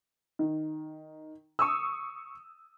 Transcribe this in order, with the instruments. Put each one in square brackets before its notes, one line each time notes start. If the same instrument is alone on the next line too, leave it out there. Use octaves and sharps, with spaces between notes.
[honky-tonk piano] D#3
C#6 D#6 E6